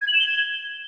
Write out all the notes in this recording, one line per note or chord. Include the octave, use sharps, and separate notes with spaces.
G#6
F#7
E7
G7
G#6